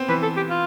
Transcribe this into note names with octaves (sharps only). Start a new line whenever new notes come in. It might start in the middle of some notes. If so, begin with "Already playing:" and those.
Already playing: B3 C4
E3 B4
A4
G4
F4